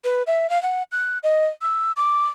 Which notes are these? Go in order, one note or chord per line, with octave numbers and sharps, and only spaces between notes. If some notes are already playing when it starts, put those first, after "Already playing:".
B4
E5
F5
F#5
F#6
D#5
E6
D6